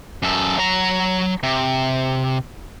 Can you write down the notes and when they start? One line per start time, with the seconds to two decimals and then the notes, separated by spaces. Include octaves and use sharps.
0.23 F#2 A4
0.59 F#3 A#5
1.43 C3